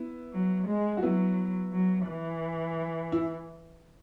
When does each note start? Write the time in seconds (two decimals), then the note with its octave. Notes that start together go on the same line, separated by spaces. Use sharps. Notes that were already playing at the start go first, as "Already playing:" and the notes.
Already playing: B3 E4
0.33 F#3
0.68 G#3
0.97 F#4
1.02 F#3 B3 E4
1.73 F#3
2.08 E3
3.12 E4